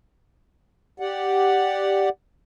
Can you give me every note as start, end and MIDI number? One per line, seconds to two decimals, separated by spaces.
1.00 2.09 67
1.00 2.09 74
1.00 2.09 78